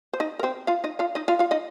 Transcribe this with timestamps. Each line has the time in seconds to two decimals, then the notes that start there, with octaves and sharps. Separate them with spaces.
0.13 C5
0.20 D#4 D#5
0.39 A#4
0.43 C4 C5
0.67 F4 F5
0.84 D#4 D#5
0.99 F4 F5
1.15 D#4 D#5
1.28 F4 F5
1.39 F4 F5
1.51 D#4 D#5